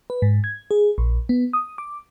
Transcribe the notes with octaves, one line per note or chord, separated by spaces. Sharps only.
B4
G#2
G#6
G#4
A#1
B3
D#6
D6